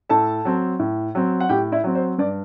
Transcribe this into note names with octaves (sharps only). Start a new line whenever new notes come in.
A2 A4 A5
F#3 C4
A2
F#3 C4
F#5
A2 G4 G5
E4 E5
F#3 C4
C5
G2 D5